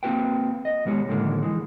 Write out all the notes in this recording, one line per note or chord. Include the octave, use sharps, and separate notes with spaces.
A#3 C4 F4 F#4 B4 G5
D#5
D#2 B2 G3 G#3 A#4 C#5
A2 D3 D#3 F3 G#3 A#3
E3 G#3